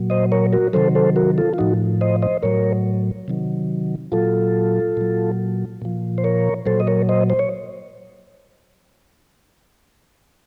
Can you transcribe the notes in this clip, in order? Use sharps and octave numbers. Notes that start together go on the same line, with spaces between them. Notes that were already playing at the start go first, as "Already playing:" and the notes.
Already playing: A#2 F#3
C5 D#5
A#4 C#5
F#4 A#4
C3 D#3 F#3 A4 C5
A4 C5
F#4 A#4
F4 A4
F4
A2 F3 D#4 F#4
C5 D#5
C5 D#5
A2 F#3 A#4 C#5
C3 D#3 F#3
A#2 F#3 F4 A4
A#2 F#3
A#2 F3
C5
A#4 C#5
A#2 F#3 A4 C5
D#5
A#4 C#5
C5 D#5
C5
C#5